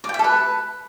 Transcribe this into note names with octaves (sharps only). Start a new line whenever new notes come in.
D5
G5
E5
A4
B4